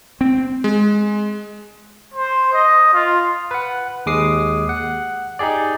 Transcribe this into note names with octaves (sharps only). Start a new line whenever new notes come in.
C4
G#3
C5
D#5
F4
B4 F#5
D#2 G#3 D6 D#6 C7
F#5
D#4 G4 G#4 D5